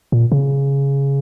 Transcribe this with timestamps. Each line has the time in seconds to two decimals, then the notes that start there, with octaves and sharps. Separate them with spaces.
0.12 A#2
0.32 C#3